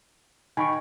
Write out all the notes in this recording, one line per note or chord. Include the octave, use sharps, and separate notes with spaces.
D#3 G5 G#5 B5 C#6